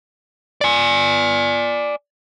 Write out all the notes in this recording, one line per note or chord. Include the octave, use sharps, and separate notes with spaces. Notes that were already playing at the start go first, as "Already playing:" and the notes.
D5 G#5